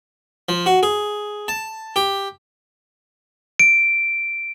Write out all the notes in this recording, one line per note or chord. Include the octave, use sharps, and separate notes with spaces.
F3
F#4
G#4
A5
G4
D7